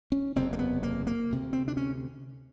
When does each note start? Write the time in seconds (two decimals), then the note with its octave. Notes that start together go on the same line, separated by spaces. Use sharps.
0.12 C#4
0.36 F#1 E2 C3 C4
0.53 A#3
0.59 B3
0.83 A#3
1.07 A#3
1.30 D2 C3
1.53 C4
1.68 D4
1.77 C#4